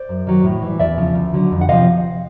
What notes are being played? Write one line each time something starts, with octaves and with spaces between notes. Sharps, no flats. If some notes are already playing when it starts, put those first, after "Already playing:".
Already playing: C5 D5
F#2
D#3 F#3
A2
E3 G3
E2 D5 E5
C#3 F3
D2
D3 F#3
F2
F#5
C3 F3 D#5 F5